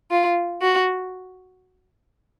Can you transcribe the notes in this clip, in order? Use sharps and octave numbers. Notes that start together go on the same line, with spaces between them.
F4
F#4